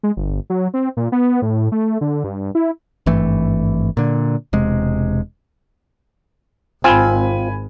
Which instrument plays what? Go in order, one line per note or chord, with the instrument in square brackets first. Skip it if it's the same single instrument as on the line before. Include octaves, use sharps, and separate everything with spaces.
[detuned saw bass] G#3
G1
F#3
C4
A#2
B3
A2
A3
D3
G2
E4
[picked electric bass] G#1 G2 E3 A3
A#2 D3
E1 C3 G#3
[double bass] G#1 [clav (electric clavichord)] C4 F4 [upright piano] G#5 B5